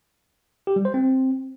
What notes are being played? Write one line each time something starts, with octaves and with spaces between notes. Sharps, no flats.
G4
G3
C5
C4